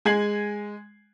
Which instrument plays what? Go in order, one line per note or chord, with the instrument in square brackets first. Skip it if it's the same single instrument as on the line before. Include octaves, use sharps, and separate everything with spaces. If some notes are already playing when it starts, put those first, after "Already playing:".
[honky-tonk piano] G#3 G#5 G#6 C7 F#7